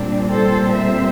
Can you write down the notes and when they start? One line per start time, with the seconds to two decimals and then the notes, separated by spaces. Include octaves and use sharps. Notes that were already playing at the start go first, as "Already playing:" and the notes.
Already playing: A#2 G3 C4 D4
0.31 A4 C5
0.75 C5 E5